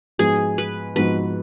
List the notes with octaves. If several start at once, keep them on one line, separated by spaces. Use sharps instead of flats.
G#2 F3 B3 F#4 G#4
B4
G#2 F3 B3 F#4 B4